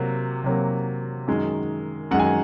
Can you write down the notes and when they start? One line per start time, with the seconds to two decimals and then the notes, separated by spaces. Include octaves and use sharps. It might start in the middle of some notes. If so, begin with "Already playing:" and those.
Already playing: C3 F#3 A#3
0.44 C3 F#3 A#3
1.27 F#2 D#3 G#3
2.11 F#2 D#3 G#3 F#5
2.20 G#5